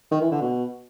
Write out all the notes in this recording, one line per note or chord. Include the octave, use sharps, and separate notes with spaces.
D#3
E3
D3
B2